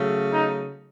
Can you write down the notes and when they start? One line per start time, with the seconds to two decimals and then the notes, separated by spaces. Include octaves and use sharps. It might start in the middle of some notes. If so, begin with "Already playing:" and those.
Already playing: C#3 F#3 A3
0.31 D#4